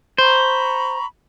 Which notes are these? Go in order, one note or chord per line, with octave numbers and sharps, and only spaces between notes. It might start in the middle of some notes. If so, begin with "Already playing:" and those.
C5 A#5 B5 C#6